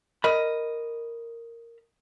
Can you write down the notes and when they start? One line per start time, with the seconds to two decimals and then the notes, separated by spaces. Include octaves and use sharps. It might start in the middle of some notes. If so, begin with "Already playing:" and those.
0.24 A#4 D#5 B5